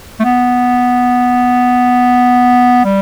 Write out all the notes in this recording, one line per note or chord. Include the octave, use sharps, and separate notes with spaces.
A3
B3
G3